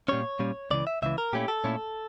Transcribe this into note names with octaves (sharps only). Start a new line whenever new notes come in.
A#2 G3 C#4 C#5
A#2 G3 C#4
C#2 C#3 E3 D5
E5
C#2 C#3 E3 E5
A#4
A#2 A3 C#4 E4 G4
A4
A#2 A3 C#4 E4